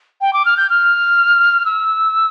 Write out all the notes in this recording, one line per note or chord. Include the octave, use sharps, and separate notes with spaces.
G5
D6
F6
G6
F6
E6